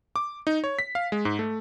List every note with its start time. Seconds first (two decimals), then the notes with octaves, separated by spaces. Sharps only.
0.16 D6
0.47 D#4
0.64 C#5
0.79 B6
0.95 F5
1.12 G#3
1.25 G#2
1.39 A3